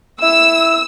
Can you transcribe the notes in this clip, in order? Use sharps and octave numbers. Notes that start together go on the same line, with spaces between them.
E4 E6